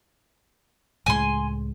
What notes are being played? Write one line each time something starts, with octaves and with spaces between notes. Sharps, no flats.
C#2 A2 G#3 G#5 C6